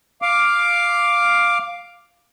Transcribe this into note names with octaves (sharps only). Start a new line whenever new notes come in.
F5 D6